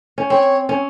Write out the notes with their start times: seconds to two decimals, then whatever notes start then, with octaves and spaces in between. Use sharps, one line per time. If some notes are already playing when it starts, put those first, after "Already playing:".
0.18 C#4
0.29 C4 C#5
0.69 C#4